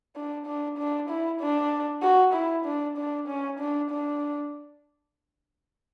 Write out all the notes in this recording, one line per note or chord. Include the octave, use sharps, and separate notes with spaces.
D4
D4
D4
E4
D4
F#4
E4
D4
D4
C#4
D4
D4